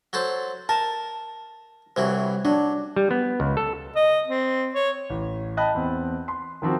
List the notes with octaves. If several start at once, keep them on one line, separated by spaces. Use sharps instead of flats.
F#3 A4 C5
A#4 A5
C2 E3 F#3 C5
F#3 D4
G3
B3
C#2
A4
D#5
C4
C#5
A1
D#5 G5 A5 B5 F#6
E2 C4
C6
D#3 F3 C4 F#4